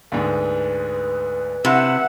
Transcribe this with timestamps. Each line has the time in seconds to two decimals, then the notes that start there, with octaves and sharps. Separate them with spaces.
0.12 D2 G#2 B4
1.65 C3 E4 E5 F#5